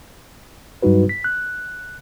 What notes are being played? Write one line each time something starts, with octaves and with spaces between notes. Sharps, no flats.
G2 F#3 G3 D#4 F#4 B4
B6
F#6